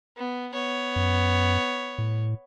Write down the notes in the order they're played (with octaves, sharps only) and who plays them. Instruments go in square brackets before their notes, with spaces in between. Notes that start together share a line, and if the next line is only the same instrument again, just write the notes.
[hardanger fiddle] B3
B3 C#5
[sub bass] F#2
A2